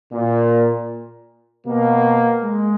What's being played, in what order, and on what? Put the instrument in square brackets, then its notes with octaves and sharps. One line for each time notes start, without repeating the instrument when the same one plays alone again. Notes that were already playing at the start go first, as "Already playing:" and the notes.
[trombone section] A#2
B2 A#3
G#3